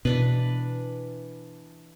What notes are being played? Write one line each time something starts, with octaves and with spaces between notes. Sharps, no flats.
B2 E3 D4 B4